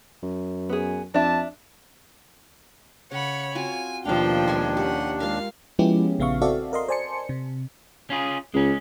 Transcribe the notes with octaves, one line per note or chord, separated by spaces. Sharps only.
F#2
B3 G#4
F2 D4 E5 A5
C#3 C#5 F#5 B5
C4 F4 F#4 G#5
D#2 B2 F3 D4 F4 A#4 F5 G5
G#3 G#5 C6
C#4 G4 F#5 G5
G#3 F4 A#4 F5
F3 G#3 B3 C#4 E4 G4
A#1 C#3 B3 E5 F5 C#6
C4 F#4 A4 D5 E5 F5
A#4 D#5 C6
C5 D5 G#5 A5 C6 C#7
C3
C#4 F4 G#4
C#2 G#3 C#4